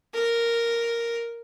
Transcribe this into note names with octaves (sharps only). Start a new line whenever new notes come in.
A#4